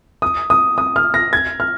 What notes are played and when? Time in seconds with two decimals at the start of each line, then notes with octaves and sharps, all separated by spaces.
0.22 D#6
0.50 D#6
0.78 D#6
0.96 F6
1.14 A#6
1.33 G#6
1.60 F6